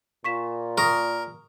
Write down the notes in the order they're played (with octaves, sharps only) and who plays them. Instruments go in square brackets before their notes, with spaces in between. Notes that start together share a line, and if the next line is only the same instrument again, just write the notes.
[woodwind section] A#2 [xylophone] C#6 B6 E7
[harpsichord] A#4 [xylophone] C#6 D#6 A#6